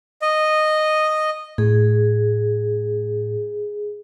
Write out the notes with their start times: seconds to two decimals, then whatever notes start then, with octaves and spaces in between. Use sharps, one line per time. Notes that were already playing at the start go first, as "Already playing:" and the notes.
0.22 D#5
1.58 A2 G#4